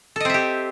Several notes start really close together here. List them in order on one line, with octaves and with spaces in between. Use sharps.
A4 D#5 C4 E5 G4